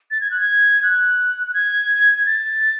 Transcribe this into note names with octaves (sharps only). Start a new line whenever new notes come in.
A6
G#6
F#6
G#6
F#6
F#6
G#6
G#6
A6